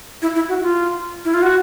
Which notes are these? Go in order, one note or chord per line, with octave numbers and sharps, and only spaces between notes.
E4
E4
F#4
F4
E4
F4
F#4